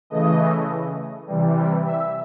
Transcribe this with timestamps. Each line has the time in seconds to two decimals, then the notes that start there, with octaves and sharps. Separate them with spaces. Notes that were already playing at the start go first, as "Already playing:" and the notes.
0.10 C#3 E3 A3 D#5
1.27 C3 E3 G3
1.85 E5